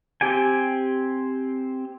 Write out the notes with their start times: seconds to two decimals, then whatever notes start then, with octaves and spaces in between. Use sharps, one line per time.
0.21 C4 G4 G5 G#5